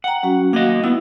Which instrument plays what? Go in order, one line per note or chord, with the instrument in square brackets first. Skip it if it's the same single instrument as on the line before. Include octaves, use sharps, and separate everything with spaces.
[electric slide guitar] F#5 [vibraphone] G5 A#5
[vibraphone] F#3 C#4 F#4
[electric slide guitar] A#3 D#5 [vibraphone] F#4 F5 F#5
[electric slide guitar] B3 [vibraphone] E4 E5